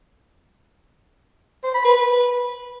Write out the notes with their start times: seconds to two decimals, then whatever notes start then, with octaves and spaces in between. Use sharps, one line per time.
1.63 C5
1.74 B5
1.85 B4